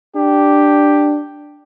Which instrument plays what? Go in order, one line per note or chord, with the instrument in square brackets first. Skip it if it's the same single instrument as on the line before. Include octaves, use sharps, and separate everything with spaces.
[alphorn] D4 [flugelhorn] G4